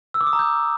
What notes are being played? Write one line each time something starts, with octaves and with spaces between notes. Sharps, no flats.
E6
D6
D#6
A#5
G6